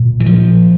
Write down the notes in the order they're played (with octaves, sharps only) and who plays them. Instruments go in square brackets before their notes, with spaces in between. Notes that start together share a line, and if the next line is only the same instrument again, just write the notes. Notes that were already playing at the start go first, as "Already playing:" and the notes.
Already playing: [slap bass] A#2
E3
F3